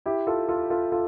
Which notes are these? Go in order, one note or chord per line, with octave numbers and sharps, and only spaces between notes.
E4 G4
F4 A4
F4 A4
F4 A4
F4 A4